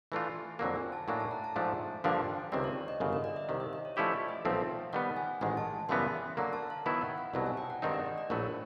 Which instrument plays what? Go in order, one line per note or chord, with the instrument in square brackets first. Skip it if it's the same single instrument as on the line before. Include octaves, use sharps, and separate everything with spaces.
[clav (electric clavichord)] E3 A3 D4 F4 [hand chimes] G#5
[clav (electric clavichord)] F2 D3 F#3 A#3 [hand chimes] G5
[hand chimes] G#5
A5
[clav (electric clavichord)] A2 F#3 A#3 D4 [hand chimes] G#5
[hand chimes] A5
A#5
A5
[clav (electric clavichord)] G#2 F3 A3 D4 [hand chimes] G#5
[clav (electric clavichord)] G2 D3 F3 A#3 D4 [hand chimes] G5
[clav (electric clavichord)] C#2 C3 D#3 G3 C4 [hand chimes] D5
[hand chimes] C#5
D#5
[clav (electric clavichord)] G1 F#2 C#3
[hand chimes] D#5
D5
E5
[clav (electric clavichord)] C2 C3 D#3 [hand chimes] F5
[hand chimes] E5
D#5
C#5
[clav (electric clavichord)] F3 A3 C#4 E4 G4 [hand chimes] D5
[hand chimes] D#5
E5
[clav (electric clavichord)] B1 A#2 F3 A3 C4 [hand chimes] F5
[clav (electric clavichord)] D#3 G3 B3 [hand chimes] F#5
[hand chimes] G#5
[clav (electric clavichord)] A1 G#2 D#3 G#3 [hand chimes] G#5
[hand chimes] A5
[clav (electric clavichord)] F#2 C#3 E3 G3 B3 [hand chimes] C6
[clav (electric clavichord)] D3 F#3 A#3 [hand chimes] A#5
[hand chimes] A5
F5
[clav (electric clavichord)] D#3 F#3 B3 E4 [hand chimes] G5
[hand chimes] F#5
F5
[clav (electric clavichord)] C2 B2 F#3 [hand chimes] A5
[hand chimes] G#5
G5
F#5
[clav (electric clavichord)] G2 D#3 G#3 C4 D#4 [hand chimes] D5
[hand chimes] D#5
D5
D5
[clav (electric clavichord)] A#1 A2 F#3 A3 [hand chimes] C#5